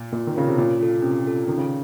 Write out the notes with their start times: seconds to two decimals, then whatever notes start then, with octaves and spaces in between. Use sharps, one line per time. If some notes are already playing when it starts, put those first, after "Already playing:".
Already playing: A#2
0.12 A#2 A#3
0.27 D#3
0.35 C#3 F4 A#4 C#5 F5
0.47 C3
0.58 A#2 C#4
0.80 F4 A4
1.02 C3 C#4
1.25 F4 A4
1.48 D#3 C#4
1.58 C#3